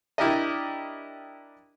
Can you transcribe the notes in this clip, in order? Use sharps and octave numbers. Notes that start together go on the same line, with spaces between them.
D4 E4 G4 A#4 D5 D#5